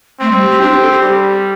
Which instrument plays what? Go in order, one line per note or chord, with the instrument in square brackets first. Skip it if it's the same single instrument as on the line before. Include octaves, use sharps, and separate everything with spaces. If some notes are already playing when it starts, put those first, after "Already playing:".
[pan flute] A3 [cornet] C4
[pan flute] G3
G4
G4
[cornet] C4 [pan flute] D4
[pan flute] G4
A4
G4
[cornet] G3 [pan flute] G4